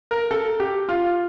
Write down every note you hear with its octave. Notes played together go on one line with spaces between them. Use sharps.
A#4
A4
G4
F4